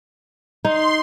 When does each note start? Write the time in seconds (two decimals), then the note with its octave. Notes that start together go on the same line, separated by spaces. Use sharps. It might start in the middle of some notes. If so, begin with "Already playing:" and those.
0.65 D#4 C6